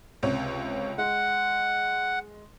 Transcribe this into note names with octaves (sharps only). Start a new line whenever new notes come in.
C#2 C3 C#5
G#3 F#5